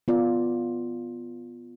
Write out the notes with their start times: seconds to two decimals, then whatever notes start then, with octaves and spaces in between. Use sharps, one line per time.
0.08 B3 F4 D5